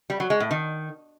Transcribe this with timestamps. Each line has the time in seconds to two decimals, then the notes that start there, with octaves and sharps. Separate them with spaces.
0.10 G3
0.20 F#3
0.30 G#3
0.40 A2
0.51 D#3